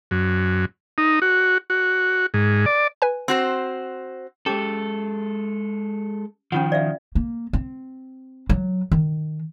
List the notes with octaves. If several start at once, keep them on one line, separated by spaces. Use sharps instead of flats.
F#2
D#4
F#4
F#4
G#2
D5
B4 G#5
C4 F#4 C5
G#3 C#4 G4 A4 D6
D#3 F3 C#4 F4 F#5
D5 E5 F5
A#3
C4
F#3
D#3